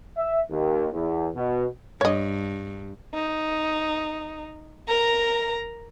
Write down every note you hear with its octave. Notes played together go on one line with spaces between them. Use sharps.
E5
D#2
E2
B2
G2 C#5 D#5
D#4
A#4 A#5